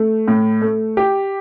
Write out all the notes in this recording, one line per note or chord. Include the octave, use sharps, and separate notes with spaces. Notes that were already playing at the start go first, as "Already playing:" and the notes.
Already playing: A3
A2
A3
G4